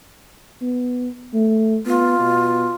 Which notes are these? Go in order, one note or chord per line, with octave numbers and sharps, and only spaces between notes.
B3
A3
B3 F4
B2